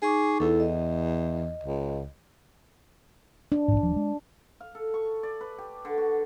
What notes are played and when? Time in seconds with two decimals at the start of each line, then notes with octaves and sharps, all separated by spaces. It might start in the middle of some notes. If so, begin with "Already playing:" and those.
0.02 D#4 G#4 C#6 D6
0.40 E2 E4 A4
0.60 D#5
1.64 C#2
3.52 D4
3.68 A#1 G#2
3.81 D#1 F3
3.96 G#3
4.61 F5
4.75 A4
4.94 C#6
5.23 D5
5.41 B4
5.58 G4
5.85 D3
5.98 F#4